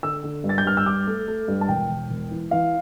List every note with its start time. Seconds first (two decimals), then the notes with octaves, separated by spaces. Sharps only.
0.03 D3 E6
0.24 D3
0.44 G2
0.49 A6
0.58 G6
0.65 G2 F6
0.77 E6
0.86 G2 D6
1.07 A3
1.28 A3
1.48 G2
1.61 A5
1.69 E1 G5
1.90 E1
2.10 E1
2.31 E3
2.51 E3 F5